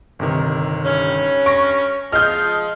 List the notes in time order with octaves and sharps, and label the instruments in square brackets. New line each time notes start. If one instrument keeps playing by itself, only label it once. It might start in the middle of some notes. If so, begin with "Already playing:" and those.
[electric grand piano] G1 C3 D#3
[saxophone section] G2 C#4
[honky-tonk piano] C#6 [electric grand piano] A#6 D7
[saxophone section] F3 G#3 F4 [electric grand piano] D#5 D#6 [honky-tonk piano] F6 G6